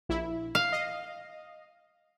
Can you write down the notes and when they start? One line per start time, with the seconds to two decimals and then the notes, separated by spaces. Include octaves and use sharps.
0.09 A#1 E4
0.55 F5
0.72 D#5